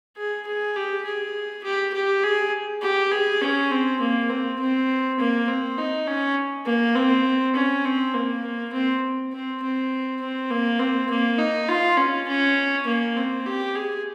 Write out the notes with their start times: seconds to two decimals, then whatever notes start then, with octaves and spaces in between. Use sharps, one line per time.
0.17 G#4
0.46 G#4
0.76 G4
1.05 G#4
1.64 G4
1.94 G4
2.24 G#4
2.82 G4
3.11 G#4
3.41 C#4
3.71 C4
4.00 A#3
4.30 C4
4.59 C4
5.19 A#3
5.48 C4
5.78 D#4
6.07 C#4
6.66 A#3
6.95 C4
7.55 C#4
7.85 C4
8.14 A#3
8.73 C4
9.32 C4
9.62 C4
10.21 C4
10.51 A#3
10.80 C4
11.10 A#3
11.39 D#4
11.68 F4
11.97 C#4
12.28 C#4
12.86 A#3
13.16 C4
13.46 G4
13.75 G#4